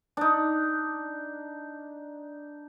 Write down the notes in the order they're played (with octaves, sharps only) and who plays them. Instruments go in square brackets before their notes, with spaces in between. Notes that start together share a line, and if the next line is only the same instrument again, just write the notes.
[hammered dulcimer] D4 D#4